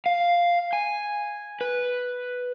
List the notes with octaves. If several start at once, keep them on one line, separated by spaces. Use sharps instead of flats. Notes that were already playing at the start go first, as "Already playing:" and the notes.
F5
G#5
B4